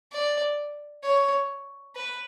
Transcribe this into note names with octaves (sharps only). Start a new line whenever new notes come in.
D5
C#5
B4